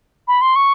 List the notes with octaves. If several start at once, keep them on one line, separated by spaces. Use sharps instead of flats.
B5
C6
C#6